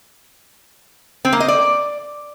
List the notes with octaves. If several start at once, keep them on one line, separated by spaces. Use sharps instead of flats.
C4
A#3
D#5
D5